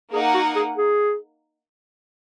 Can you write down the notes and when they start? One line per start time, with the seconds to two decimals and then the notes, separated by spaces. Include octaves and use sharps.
0.13 A#3 D#4 G#4 A#4 F#5
0.34 F#4
0.56 G#4
0.77 G#4